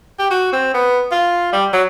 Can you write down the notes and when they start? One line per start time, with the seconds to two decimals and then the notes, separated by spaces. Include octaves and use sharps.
0.19 G4
0.30 F#4
0.53 C4
0.74 B3
1.11 F4
1.53 G3
1.73 F#3